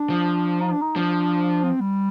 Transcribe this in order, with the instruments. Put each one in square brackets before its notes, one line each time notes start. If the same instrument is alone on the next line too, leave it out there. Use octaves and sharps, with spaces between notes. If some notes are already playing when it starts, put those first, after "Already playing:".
Already playing: [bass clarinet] D4
[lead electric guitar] F3
[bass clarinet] D#4
D4
D#4
[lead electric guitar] F3 [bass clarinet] D4
[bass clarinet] C4
G3